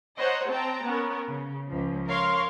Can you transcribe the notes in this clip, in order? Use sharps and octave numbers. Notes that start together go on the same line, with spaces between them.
C5 C#5 D#5 F#5 A#5
C4 G5 A5 A#5
B3 C#4 A#4
C#3
C#2 F3
A#4 C#5 F5 C6